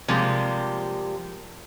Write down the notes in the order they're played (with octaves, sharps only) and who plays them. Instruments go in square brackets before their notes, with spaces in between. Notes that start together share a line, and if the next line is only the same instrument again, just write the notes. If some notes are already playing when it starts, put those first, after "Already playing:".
[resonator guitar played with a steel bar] C3 F3 G3 G#3 A#3